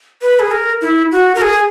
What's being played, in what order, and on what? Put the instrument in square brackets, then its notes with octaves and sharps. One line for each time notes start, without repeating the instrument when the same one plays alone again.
[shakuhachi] B4
G#4
A#4
E4
F#4
A#4
G#4